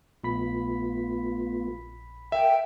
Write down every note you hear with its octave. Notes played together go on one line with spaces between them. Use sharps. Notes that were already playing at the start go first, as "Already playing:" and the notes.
A#1 A3 B3 F4 B5 B6
A#4 E5 F5 G5